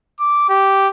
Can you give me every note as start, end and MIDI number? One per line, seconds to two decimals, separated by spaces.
0.20 0.48 86
0.49 0.89 67